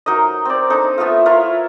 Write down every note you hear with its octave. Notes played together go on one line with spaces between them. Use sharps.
F#3 D#4 A#4 D#5
C4 D5
D4 D#4 A4
A3 B3 E4 F4
E4 F4 A#4 C#5